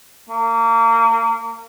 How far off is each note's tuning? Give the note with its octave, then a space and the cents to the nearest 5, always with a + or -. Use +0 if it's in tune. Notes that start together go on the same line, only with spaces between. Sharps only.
A#3 -30